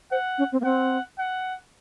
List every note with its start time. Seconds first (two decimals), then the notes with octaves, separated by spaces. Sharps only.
0.11 C5 F#5
0.38 C#4
0.52 C4
0.61 A#3
0.64 C4 F#5
1.19 F#5